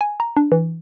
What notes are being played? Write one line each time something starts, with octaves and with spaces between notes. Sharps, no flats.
G#5
A#5
D4
E3